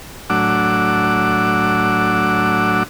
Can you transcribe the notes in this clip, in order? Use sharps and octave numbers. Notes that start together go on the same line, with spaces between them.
A2 F#3 D4 F#5 D6 E6